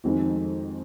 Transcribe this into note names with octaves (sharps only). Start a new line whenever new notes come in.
F2 D#3 G#3 C4 F#4